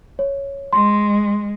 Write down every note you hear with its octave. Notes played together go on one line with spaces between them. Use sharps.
C#5
G#3 C6